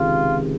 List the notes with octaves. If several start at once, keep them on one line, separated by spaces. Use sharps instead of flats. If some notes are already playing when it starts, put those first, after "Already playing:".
Already playing: C#2 C3 D#3 F4